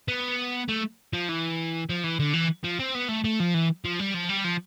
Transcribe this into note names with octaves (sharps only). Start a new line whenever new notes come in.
B3
A3
F3
E3
F3
E3
D3
E3
F3
C4
B3
A3
A3
F3
E3
F3
G3
F3
G3
F3